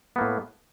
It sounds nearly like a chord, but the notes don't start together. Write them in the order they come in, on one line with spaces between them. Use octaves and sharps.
B3 A#3 A2